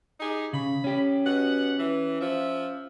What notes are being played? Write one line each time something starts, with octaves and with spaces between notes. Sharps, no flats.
D#4 G4 G#4
C#3 B5
C#4 G4
B2 F#5
E3
F3 E5